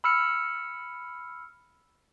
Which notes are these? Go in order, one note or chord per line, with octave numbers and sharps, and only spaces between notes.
B5 E6 F6 C#7